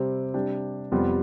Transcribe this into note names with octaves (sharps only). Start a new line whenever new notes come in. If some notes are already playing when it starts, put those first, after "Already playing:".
Already playing: C3 G3 C4
C3 G3 D4 G4
F2 C3 G3 B3 F4